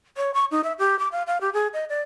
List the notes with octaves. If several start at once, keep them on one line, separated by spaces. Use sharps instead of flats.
C#5
C#6
D#4
E5
G4
D6
F5
F5
G4
G#4
D#5
D5